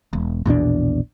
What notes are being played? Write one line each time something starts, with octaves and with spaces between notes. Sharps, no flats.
E1
A#1 E2 B2 D4